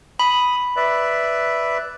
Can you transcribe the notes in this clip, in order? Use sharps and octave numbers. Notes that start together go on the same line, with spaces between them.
B5 D#6
B4 D5 E5